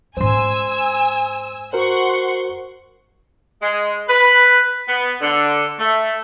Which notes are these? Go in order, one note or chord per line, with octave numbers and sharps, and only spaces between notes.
G#2 C#4 C5 G#5 C6 E6
F#4 A#4 C5 F#5 C6 C#6
G#3
B4
B3
D3
A3